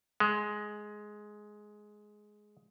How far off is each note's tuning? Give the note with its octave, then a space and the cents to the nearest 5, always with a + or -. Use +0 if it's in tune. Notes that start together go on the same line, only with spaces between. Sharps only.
G#3 +10